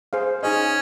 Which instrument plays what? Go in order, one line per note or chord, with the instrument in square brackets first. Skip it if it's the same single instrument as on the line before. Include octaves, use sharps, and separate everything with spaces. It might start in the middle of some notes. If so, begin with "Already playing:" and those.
[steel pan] G#4 C5 F5
[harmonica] C#4 [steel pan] D#4 G#4 D#5